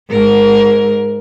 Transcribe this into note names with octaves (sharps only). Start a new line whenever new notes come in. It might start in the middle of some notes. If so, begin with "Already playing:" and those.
G#2 A#4